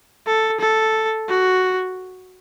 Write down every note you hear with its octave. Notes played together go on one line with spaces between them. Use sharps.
A4
A4
F#4